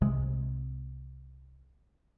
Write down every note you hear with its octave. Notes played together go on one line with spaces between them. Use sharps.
C2 C3 G#3